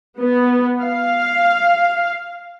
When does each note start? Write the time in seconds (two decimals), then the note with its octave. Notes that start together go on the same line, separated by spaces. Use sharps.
0.19 B3
0.81 F5